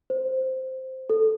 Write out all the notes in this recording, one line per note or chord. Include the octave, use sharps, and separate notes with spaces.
C5
A4